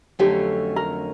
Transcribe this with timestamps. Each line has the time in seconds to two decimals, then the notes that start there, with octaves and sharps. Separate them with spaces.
0.19 F2 D3 F#3 A3 C#4 G4
0.76 A#4